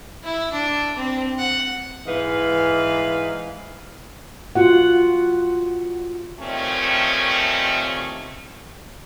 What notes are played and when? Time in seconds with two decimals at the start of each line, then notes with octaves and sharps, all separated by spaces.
0.24 E4
0.52 D4
0.96 C4
1.38 F#5
2.07 G#2 E3 D#4 B4 F5
4.55 F4 F#4 F#5
6.40 D#2 A#2 D#3 A3 C4 C#4